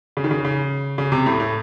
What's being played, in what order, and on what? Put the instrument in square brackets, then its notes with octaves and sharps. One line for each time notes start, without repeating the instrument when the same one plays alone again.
[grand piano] C#3
D#3
C#3
C#3
C#3
C3
A2
A2